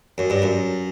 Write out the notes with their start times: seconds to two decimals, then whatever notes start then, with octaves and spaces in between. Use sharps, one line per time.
0.18 F#2
0.30 G2
0.42 F#2